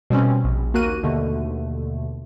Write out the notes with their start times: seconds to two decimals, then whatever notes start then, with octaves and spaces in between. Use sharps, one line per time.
0.10 B2 G3 C4 C#4
0.44 A#1
0.74 D#2 A#3 F#4 A#4 F#6 D#7
1.03 D#2 B2 D3 A3